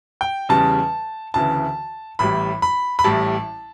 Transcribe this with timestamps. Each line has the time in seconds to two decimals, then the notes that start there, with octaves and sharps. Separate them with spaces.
0.21 G5
0.49 E2 C#3 G3 A5
1.34 D2 C#3 E3 A5
2.19 A1 A2 G3 B5
2.62 B5
2.99 B5
3.04 A1 A2 G3 A5